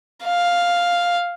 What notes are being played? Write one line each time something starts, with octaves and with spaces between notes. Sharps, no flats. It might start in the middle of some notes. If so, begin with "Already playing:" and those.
F5